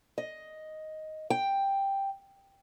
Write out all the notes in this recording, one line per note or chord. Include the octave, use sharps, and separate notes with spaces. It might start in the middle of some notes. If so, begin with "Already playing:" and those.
D#5
G5